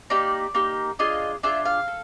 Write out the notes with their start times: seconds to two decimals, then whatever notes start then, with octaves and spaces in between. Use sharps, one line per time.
0.10 A#3 D#4 G4 D5
0.55 A#3 D#4 G4
0.99 D4 F4 G#4 D#5
1.43 D4 F4 G#4 E5
1.65 F5
1.88 A4